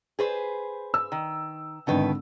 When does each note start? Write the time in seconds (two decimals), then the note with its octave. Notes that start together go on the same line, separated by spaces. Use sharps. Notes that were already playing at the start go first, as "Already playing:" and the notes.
0.19 G#4 B4 C5
0.94 E6
1.12 D#3
1.87 G#1 B2 D3 D#3 B4